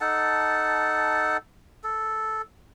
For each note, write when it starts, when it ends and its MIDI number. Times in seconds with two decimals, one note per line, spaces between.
0.01 1.37 63
0.01 1.37 69
0.01 1.37 78
0.01 1.37 81
1.84 2.42 69